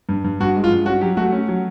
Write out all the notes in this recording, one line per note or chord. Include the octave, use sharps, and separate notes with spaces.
G2
G2
G2 F#4
G#3
F4
G2
C#4 F#4
F#3 G4
A3 F#4
C#4
F#3